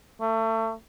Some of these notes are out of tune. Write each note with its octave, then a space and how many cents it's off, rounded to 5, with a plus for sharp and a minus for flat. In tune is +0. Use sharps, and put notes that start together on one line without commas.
A3 +30